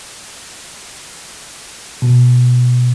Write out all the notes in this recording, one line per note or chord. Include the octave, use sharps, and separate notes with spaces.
B2